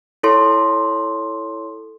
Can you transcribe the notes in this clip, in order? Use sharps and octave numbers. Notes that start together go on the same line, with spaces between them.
E4 A4 C#5 C6